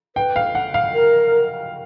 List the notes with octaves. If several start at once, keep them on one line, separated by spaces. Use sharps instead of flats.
B4 G5
F5
F#5
F5
A#4